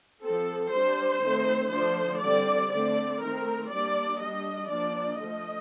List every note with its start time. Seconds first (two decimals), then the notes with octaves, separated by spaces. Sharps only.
0.22 F3 C4 A4
0.72 G3 D4 C5
1.22 D#3 A3 C4
1.71 D3 F3 A3 D4 C5
2.21 D3 G3 C4 D5
2.70 D3 A3 C4 D5
3.21 D#3 A3 C4 A#4
3.70 G3 A#3 D4 D5
4.20 G3 D4 D#5
4.70 F3 A#3 D4 D5
5.19 D3 F3 A3 D#5